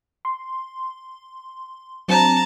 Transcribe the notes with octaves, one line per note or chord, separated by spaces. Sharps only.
C6
F#3 C4 D4 A5 A#5